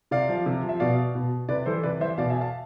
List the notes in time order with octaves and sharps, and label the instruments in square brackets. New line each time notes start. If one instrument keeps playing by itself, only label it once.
[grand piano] C3 D5 F5
F3
C3
F3
E5
B2 D5 F5
B2
C3 B4 D5
E3 A4 C5
C3 B4 D5
E3 C5 E5
B2 D5 F5
E5 G#5
F5 A5